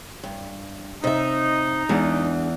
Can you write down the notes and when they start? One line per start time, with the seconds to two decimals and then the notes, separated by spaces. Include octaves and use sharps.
0.23 G2
1.04 C3 D#4 E5
1.89 E2 G#3 D4 F#5